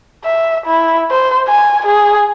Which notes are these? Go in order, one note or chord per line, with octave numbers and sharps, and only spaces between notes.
E5
E4
C5
G#5
G#4